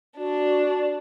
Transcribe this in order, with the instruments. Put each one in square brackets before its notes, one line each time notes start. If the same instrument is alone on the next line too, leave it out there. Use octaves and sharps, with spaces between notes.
[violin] D4 [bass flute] F#4